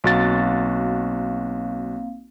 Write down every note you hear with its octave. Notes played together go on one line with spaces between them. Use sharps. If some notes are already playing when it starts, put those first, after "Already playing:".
B1 A#3 C4 F#4 F5 A6